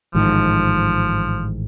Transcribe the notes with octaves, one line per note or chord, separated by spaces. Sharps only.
A1 G#2 D#3 F3